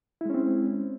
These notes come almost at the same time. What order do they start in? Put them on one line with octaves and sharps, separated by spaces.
E4 G#3 C#4 C4